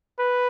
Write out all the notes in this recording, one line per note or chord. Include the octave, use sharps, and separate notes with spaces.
B4